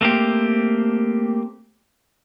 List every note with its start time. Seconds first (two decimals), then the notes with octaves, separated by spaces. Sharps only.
0.01 A3 A#3 C4 G4